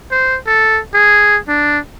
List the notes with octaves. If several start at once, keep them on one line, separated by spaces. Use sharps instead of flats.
C5
A4
G#4
D4